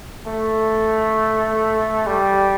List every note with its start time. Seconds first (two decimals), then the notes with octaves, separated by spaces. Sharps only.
0.26 A3
2.07 G3